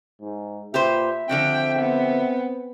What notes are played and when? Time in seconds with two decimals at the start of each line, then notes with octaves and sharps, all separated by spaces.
0.22 G#2
0.74 A#2 G4 B4 C5 E5
1.29 D3 F3 C4 F#4 G5
1.79 B3